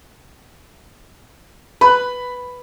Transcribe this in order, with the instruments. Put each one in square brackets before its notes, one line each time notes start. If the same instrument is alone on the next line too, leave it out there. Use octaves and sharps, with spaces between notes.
[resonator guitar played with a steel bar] B4 [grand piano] B5